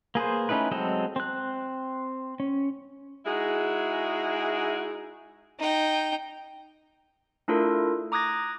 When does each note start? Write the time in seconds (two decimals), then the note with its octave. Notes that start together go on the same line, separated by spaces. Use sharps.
0.15 A#3 G#4 B4 C5
0.49 A3 C#4 D#4 E4 B4
0.71 F#3 G#3 C4 A4 D#5
1.16 C4 F#6
2.40 C#4
3.26 G#3 D#4 E4 F#4 G#4
5.59 D#4 G5
7.48 A3 D4 E4 F4 A4 A#4
8.12 A#5 D6 D#6 F#6 G#6 A#6